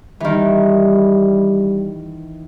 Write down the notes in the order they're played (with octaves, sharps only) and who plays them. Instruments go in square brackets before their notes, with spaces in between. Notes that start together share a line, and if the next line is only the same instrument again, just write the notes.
[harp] D#3 E3 [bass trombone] G3